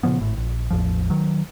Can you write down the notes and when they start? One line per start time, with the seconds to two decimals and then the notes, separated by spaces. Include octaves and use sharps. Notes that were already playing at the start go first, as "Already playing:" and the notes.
0.03 A#2 C#3 F3 B3
0.20 G#1 A2
0.37 A#1
0.70 A1 E2 F3
1.10 D#3 F#3